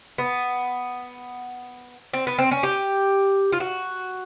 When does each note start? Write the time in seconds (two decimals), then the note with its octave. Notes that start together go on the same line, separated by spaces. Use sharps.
0.18 B3
2.13 C4
2.27 B3
2.38 C4
2.51 C#4
2.63 G4
3.52 F4
3.60 F#4